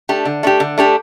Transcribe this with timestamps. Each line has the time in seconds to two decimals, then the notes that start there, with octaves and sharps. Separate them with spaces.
0.09 A3 D4 G4
0.25 D3
0.43 A3 D4 G4
0.60 D3
0.78 A3 D4 G4